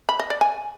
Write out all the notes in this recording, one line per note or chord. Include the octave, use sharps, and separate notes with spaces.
B5
D#5
D5
G#5